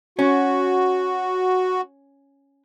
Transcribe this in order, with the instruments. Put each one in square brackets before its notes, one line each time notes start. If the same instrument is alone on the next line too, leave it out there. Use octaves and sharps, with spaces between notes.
[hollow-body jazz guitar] C#4 [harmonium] F#4